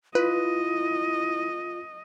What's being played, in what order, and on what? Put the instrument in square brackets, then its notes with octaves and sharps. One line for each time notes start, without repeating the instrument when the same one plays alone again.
[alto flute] E4 [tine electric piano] F4 [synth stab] B4 [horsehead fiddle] D#5